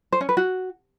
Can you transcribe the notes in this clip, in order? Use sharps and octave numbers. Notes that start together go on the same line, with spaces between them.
C5
C#4
B4
F#4